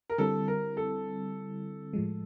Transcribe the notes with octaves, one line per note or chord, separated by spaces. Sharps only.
A#4
D3 G3 C4 E4 A4
A#4
A4
A2 F3 G#3